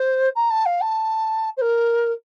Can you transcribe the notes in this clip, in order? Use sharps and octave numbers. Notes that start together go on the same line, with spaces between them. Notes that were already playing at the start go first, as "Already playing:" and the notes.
Already playing: C5
A#5
A5
F5
A5
C5
A#4